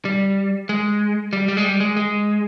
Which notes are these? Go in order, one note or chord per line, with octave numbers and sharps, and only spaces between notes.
G3
G#3
G3
G3
G#3
G3
G#3
G#3